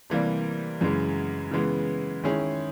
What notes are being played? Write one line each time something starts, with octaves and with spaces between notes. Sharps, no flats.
C3 E3 G3 A#3
F#2 C#3 E3 G#3
C#3 E3 G#3 B3
D#3 G#3 C#4 E4 G#4